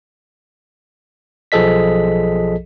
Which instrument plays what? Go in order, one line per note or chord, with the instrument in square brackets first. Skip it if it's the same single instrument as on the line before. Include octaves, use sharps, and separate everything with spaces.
[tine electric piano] B1 F3 G#4 A4 D#5 B6